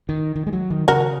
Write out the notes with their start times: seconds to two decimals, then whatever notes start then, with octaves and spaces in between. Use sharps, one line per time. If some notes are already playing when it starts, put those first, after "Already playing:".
0.09 D#3
0.36 D#3
0.47 G#3
0.53 F#3
0.70 D#3
0.88 C#3 F#4 A#4